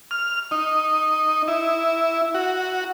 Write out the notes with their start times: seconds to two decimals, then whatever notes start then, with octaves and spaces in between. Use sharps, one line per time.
0.11 F6
0.51 D#4
1.48 E4
2.34 F#4